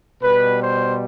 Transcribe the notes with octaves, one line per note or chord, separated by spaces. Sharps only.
B2 G3 B4
C5